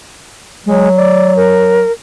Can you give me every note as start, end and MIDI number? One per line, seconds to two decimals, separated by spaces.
0.66 1.83 54
0.66 0.89 56
0.97 1.33 74
1.36 1.92 70